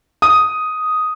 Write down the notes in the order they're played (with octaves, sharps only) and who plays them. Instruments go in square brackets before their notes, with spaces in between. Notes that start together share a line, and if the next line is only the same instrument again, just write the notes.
[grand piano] D#6